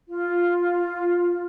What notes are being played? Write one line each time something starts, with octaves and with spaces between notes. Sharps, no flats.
F4